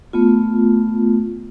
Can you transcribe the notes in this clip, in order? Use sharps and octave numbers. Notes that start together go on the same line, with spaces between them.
A3 B3 F4